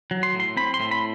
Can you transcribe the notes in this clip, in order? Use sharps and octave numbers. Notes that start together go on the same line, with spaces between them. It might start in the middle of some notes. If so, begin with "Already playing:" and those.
F#3
C6
A2 C6
C4 B5
C6
A2
B5